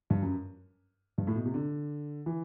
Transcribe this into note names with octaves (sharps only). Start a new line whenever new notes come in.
G2
F#2
G2
A2
B2
C3
D3
E3